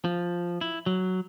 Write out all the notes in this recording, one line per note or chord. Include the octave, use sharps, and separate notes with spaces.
F3
E4
F#3